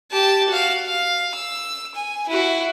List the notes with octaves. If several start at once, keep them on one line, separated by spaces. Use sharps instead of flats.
G4 A5
F#4 F5
F5
E6
G#5
E4 F#4